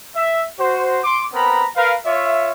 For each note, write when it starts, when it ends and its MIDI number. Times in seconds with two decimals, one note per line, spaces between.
0.15 0.42 76
0.59 0.99 66
0.59 0.99 72
1.04 1.22 84
1.04 1.22 86
1.33 1.66 59
1.33 1.66 60
1.33 1.66 70
1.33 1.66 82
1.33 1.66 83
1.75 1.95 70
1.75 1.95 71
1.75 1.95 77
2.05 2.52 65
2.05 2.52 73
2.05 2.52 76